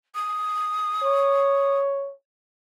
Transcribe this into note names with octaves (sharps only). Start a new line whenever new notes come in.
D#6
C#5